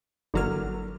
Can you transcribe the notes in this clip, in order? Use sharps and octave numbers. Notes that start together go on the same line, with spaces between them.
G1 D3 F#3 A#3 F6